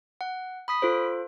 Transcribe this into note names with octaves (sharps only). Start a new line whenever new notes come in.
F#5
B5 D#6 B6
F4 A4 C5